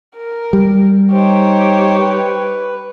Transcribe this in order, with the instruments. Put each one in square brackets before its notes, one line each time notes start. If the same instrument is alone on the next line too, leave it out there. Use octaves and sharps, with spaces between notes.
[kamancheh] A#4
[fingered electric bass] G3
[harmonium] D#4 C5 [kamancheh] G4 C#5
[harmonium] B4